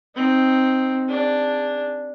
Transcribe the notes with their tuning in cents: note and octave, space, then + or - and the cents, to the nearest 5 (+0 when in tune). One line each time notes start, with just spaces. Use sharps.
C4 +0 D#4 +0
D4 +0 G#4 -25